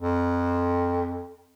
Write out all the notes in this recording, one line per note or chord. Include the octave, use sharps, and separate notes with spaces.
F2